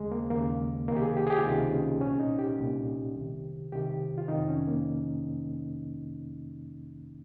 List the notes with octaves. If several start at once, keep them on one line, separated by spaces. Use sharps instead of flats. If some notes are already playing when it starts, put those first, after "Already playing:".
Already playing: D#2 C#3 G#3
A#3
D#2 C#3 A#3
C#2 C3 D#3 A#3
G4
G#4
G4
G#4
G4
F4
C#2 C3 D#3 D#4
C#4
C2 A#2 C#4
D#4
G4
C2 A#2
C2 C3 D#3
C2 C3 D#3 G4
F4
F2 C3 D#3 D#4
C#4
A#3